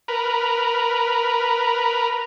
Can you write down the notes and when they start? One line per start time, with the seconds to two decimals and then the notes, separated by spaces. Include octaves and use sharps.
0.08 A#4 B4